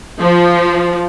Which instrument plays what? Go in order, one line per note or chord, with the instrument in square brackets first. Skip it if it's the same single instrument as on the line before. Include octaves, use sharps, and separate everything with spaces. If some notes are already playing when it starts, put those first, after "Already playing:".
[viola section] F3